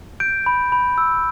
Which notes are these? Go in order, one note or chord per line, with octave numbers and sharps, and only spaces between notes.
G6 D7
B5
B5
E6